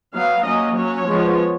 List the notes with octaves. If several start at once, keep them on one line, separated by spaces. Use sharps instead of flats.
F#3 B3 F5
F#3 A#3 C#4 D#5
F#3 C#4 C#5
F3 G#3 B3